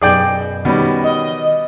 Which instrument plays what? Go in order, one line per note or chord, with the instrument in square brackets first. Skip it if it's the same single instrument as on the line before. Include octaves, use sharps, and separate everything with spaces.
[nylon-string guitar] F#2 B2 [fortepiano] G#4 D5 G5
[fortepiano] B2 G3 [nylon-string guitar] D#3 C#4
[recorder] D#5